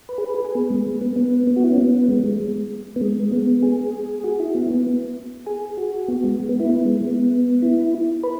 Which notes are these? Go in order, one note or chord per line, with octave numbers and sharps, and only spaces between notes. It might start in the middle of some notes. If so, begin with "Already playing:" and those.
B4
G#4
B4
G#4
G#4
B3
G#3
B3
B3
B3
F#4
E4
C#4
B3
G#3
G#3
B3
G#3
B3
G#4
F#4
E4
B3
B3
G#4
F#4
B3
G#3
B3
E4
B3
G#3
B3
E4
B4